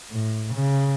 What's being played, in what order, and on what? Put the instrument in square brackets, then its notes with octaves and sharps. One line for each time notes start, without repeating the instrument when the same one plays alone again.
[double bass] A2
C#3